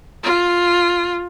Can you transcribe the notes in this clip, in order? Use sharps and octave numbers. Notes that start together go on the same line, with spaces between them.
F4